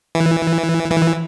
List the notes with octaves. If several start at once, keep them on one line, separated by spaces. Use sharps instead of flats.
E3
E3